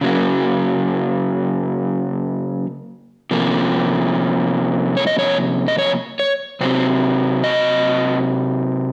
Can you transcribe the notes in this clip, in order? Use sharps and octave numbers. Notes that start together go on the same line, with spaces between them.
C#3 F#3 A#3
C3 F3 A#3
C#5
D#5
C#5
D#5
C#5
C#5
C3 F#3 C4 C5
D#5